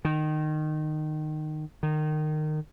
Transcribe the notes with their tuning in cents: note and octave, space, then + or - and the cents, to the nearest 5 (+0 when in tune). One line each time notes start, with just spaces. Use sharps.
D#3 -20
D#3 -25